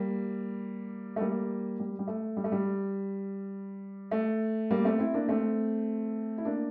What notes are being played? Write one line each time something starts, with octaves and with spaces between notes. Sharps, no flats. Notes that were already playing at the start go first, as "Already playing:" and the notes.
Already playing: G3 A#3
A3
G3 A#3
G3
G3
A3
G3
A3
G3
A3
G3 A#3
A3 C4
C4 E4
A#3 D4
A3 C4
E4
A#3 D4